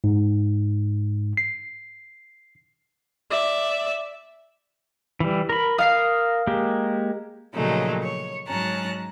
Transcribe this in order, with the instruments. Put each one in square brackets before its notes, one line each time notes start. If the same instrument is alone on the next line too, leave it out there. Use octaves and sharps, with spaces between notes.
[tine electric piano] G#2
C7
[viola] D5 E5
[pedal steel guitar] E3 G3
A#4 B5
[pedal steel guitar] A#4 D#6 [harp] F5 C7
[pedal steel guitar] G#3 A#3 G4
[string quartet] A#2 C#3 F3 F#3 A3 D#4
C#5
G#2 F#3 C#4 A5 A#5 F#6